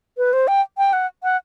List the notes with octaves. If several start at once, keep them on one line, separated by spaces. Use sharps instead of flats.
B4
C5
G5
G5
F#5
F#5